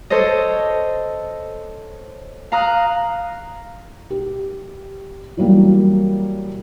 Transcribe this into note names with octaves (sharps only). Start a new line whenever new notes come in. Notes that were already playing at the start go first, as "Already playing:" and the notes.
A4 C5 C#5 D#5
F5 A#5 D#6 F#6
G4
E3 F#3 G3 A#3